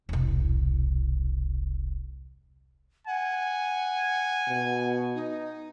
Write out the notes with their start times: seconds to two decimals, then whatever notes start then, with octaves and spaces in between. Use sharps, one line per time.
0.09 E1 C2
3.07 F#5 G#5
4.48 B2
5.15 D#4